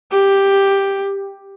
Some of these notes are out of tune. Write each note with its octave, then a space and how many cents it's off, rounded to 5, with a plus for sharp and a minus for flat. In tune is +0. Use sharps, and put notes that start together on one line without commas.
G4 +5